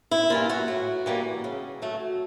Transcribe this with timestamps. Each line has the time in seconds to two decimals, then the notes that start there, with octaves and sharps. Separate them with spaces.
0.11 E4
0.30 E3 G3 A#3 F4
0.49 F#4
0.68 A2
1.06 E3 G3 A#3
1.44 C#3
1.82 F#3 A3